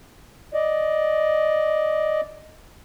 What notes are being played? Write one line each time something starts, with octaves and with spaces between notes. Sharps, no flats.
D5 D#5